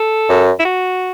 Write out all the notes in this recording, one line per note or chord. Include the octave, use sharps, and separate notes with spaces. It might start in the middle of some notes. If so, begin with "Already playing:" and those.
Already playing: A4
F#2
E4
F#4